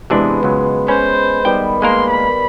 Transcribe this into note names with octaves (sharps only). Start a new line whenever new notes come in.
C3 E3 G#3 B3 D4
C#2 F#3
C#4 B4 C5
D#3 G3 B3 G5
G#3 A#3 A#4 C6
B5